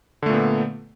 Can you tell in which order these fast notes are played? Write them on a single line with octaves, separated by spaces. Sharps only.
D3 A3 A#2 B3